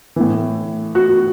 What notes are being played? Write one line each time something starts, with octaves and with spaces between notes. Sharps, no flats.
A2 E3
F#4